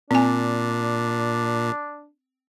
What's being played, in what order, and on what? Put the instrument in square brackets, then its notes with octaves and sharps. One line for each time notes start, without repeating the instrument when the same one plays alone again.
[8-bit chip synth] A#2 [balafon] C4 G#5 [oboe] D4